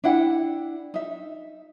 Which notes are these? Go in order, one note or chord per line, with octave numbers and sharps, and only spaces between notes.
D4 E4 F#5 G5
D#4 E5